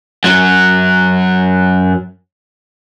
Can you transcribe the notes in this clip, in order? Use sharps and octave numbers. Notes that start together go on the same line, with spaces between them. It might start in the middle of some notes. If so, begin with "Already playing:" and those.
F#2 F#3